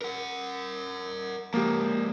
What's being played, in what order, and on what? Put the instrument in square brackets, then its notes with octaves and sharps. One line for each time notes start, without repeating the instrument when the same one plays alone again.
[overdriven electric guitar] A#4 F#5
[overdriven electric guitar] F3 G#3 [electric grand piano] A#3 G4